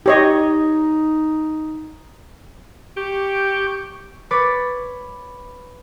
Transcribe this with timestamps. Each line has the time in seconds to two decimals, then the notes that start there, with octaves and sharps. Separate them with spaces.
0.06 D#4 G4 C#5 D#5
2.97 G4 C#6 D6 G6
4.31 B4 C#5 D6 A6